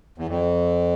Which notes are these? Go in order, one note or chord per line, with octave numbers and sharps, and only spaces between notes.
E2
F2